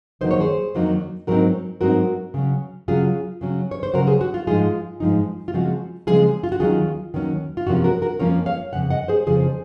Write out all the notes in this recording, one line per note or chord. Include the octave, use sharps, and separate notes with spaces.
F2 D#3 F#3 A#3 D#4 C5
C#5
G#4 C5
F2 D#3 F#3 A#3 D#4
G#2 F#3 C4 D#4 F#4 A#4
G#2 F#3 C4 D#4 F#4 A#4
C#3 F#3 C#4
C#3 F#3 C#4 F4 G#4
C#3 F#3 C#4
C#5
C5
C#3 F#3 C#4 F#4 A#4
G#4 C5
F#4
F4
G#2 F3 G#3 D#4 F4 G#4
G#2 F3 G#3 D#4
F4
C#3 F3 G#3 C4 F#4
C#3 F3 G#3 C4 F4 G#4
F4
F#4
D#2 D#3 F#3 C#4 F4 G#4
D#2 D#3 F#3 C#4
F4
F2 C3 F3 A#3 C#4 F#4
F#4 A#4
F#4 A#4
F2 C3 F3 A#3 C#4 A#4 C#5
C#5 F5
F2 C#3 F#5
D#5 F#5
G#4 C5
F2 C#3 F3 G#4 C5